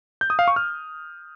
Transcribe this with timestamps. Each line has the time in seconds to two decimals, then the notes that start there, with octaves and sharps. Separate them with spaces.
0.21 G6
0.30 D#6
0.39 F5
0.48 C#6
0.56 F6